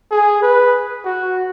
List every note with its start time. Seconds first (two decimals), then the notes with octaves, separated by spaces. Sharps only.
0.11 G#4
0.42 B4
1.05 F#4